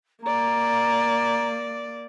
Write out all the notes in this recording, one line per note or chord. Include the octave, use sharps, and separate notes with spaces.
A#3 D5 A#5